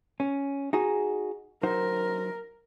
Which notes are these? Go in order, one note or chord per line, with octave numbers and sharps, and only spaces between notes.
C#4
D#4 F#4 G#4
F#3 D#4 A#4 C5